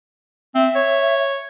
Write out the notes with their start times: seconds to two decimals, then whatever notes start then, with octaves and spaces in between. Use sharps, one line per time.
0.55 C4 E5
0.76 C#5